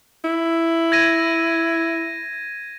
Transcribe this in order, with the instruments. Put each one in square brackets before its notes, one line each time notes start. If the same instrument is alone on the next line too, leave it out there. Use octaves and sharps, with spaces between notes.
[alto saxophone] E4
[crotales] G#6 A#6 D#7